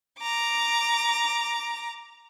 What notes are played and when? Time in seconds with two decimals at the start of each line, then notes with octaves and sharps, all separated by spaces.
0.20 A#5 D6